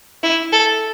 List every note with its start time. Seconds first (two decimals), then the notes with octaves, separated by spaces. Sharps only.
0.23 E4
0.52 A4